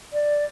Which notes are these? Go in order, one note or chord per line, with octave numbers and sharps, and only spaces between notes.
D5